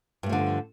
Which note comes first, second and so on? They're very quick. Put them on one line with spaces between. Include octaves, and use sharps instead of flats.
G2 A3 F3 D3